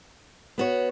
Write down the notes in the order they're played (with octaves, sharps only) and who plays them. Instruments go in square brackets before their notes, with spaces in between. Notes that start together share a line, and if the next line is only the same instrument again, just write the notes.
[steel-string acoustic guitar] B3 F#4 C#5